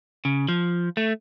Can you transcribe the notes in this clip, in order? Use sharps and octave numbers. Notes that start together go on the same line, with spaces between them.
C#3
F3
A3